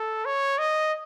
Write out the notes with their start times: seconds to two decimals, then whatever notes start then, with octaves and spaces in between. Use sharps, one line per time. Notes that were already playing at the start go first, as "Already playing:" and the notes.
Already playing: A4
0.25 C#5
0.59 D#5